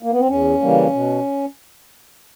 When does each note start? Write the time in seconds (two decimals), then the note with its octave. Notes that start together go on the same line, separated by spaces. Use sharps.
0.03 A#3
0.12 B3
0.19 C4
0.28 E2 C#4
0.61 C#3 E3 G3 A#3
0.93 B2